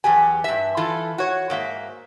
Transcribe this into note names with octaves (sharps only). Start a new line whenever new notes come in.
E2 F#3 G4 G#5
G2 E5
E3 F4 A4
F#4 C#5
G#2 A#3 E5